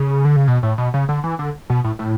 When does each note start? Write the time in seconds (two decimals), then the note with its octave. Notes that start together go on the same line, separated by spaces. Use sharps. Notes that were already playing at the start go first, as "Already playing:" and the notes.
Already playing: C#3
0.25 D3
0.36 C#3
0.48 B2
0.63 A2
0.78 B2
0.94 C#3
1.09 D3
1.24 E3
1.39 D3
1.70 B2
1.84 A2
1.99 A2